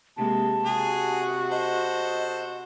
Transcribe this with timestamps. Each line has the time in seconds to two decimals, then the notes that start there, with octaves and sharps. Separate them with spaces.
0.17 C3 G#3 A#3 A5
0.66 C3 F#4 G#4
1.51 A4 C5 D#5